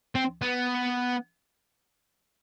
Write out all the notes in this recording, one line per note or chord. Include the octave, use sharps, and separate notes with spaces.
C4
B3